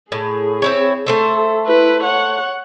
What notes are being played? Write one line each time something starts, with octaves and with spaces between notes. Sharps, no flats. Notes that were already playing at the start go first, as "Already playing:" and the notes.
A2 G#4
C4 E4 C#5
A3 A4 C5 E5
E4 B4
C#5 F#5